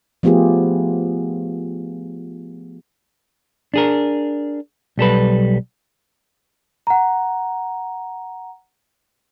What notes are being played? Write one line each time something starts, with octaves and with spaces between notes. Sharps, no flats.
F3 A3 B3 F4 G4 G#4
D4 G#4 A#4
B1 G3 A4 B4
F#5 A#5